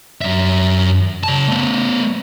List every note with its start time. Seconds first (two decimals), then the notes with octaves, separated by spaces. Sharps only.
0.21 F#2 E5
1.24 C#3 A5
1.48 A3 B3